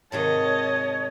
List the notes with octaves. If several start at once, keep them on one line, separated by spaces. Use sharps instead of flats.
G#2 C3 D#3 C#5 D#5 A5